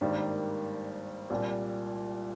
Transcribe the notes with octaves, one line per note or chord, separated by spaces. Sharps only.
G#1 G2 D#3 G3 A#3
C2 A#2 G3